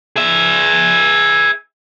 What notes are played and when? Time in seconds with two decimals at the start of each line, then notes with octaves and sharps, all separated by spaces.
0.16 G#4 E5